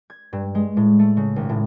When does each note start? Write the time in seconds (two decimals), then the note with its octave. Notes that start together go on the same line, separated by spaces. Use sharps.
0.10 G#6
0.33 G2
0.55 G#3
0.77 A2
0.99 A3
1.17 C#3
1.36 G#1
1.49 A2